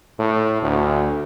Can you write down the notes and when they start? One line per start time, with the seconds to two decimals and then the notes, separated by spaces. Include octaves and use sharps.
0.19 A2
0.62 D2